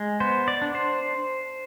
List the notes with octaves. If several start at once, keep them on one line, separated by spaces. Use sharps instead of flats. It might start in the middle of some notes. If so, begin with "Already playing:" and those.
Already playing: G#3
B3 C5
D5
D4
C5